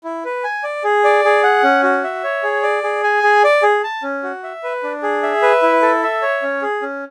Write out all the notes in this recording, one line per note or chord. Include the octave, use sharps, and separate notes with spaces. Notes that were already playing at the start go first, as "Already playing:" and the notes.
E4
B4
G#5
D5
G#4
D5
G#4
F#5
C#4
F#4
E5
C#5
G#4
D5
G#4
G#5
G#4
D5
G#4
A5
C#4
F#4
E5
B4
D4
G#4
E5
B4
E4
A4
E5
C#5
C#4
G#4
C#4